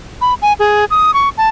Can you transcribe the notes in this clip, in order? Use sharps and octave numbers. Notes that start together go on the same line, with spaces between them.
B5
G#5
G#4
D#6
C#6
A5